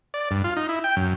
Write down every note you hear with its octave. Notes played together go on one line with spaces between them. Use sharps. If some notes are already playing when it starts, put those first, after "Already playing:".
D5
G2
F4
D#4
E4
G5
F#2